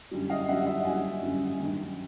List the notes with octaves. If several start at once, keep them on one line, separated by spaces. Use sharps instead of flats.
F#2 D3 G3
D#5 F5
F#2 D3 G3 E5 F#5
E5 F#5
F#2 D3 G3 F#5 G#5
F#2 D3 G3
G2 D#3 F#3